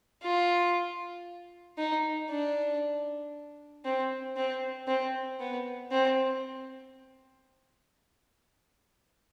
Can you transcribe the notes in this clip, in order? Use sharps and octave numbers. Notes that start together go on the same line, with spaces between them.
F4
D#4
D4
C4
C4
C4
B3
C4